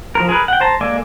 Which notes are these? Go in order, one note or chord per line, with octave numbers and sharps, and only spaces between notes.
F3 A#4
G#4 A#4 B4
F#5 G5
C5 A5 A#5
G#3 A#3 A4 D5 G#5